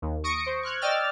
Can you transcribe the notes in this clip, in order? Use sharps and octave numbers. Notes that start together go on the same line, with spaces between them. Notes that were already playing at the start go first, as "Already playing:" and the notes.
D#2
C#6 D#6 A#6 C#7 D7
C5
C#6 F6 F#6 G#6
D5 D#5 G5 E6 F6 A6